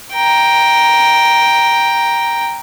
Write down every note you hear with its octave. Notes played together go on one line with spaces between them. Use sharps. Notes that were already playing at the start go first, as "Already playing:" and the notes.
G5 A#5